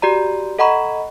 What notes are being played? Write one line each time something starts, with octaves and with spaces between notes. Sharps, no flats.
F#4 G4 D5 A#5
A4 D#5 F#5 A#5 B5 C#6